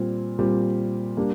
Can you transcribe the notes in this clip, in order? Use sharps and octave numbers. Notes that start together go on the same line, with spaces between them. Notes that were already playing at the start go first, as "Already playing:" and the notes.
Already playing: A#2 G3 C4
A#2 G3 C4
G3 A#3 D4 G4